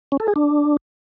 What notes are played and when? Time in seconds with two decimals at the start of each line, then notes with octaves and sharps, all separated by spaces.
0.12 C#4
0.20 A4
0.28 G#4
0.36 D4